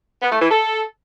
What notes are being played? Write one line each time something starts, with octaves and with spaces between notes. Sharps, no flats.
B3
A3
E3
A4